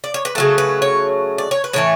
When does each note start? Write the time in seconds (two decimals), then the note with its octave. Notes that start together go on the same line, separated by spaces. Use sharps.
0.04 D5
0.14 C#5
0.25 B4
0.35 C#3 F#3 A3 A4
0.58 B4
0.82 C#5
1.38 D5
1.51 C#5
1.64 B4
1.73 A2 E3 A3 C#5